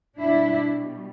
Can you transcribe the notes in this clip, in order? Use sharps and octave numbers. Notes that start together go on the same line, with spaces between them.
B2 G3 D4 E4